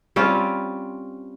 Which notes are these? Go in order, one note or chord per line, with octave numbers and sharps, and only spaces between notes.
G3 C4 C#4 F4